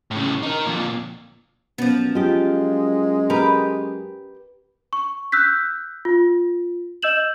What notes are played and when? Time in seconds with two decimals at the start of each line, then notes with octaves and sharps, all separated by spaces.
0.11 A2 C#3
0.43 D#4 A#4
0.66 F2 A#2
1.78 F#2 F3 B3
2.15 G#3 F4 G4
3.30 G4 A#4 B4
4.93 C#6
5.32 E6 F#6 G6 B6
6.05 F4
7.03 D#5 E6 G6 E7 F#7